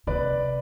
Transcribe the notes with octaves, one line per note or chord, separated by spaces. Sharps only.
C3 B4 D5